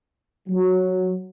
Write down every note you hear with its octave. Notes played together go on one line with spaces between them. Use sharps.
F#3